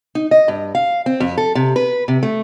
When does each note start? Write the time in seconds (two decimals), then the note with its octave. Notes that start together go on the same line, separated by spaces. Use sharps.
0.15 D#4
0.31 D#5
0.48 G2
0.75 F5
1.06 C4
1.20 F2
1.38 A4
1.55 C3
1.76 B4
2.08 C3
2.23 A3